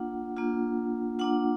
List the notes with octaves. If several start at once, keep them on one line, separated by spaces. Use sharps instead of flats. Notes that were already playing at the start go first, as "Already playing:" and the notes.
Already playing: A#3 D4 F4 F#5
A#3 D4 F4
A#3 D4 F4 F#5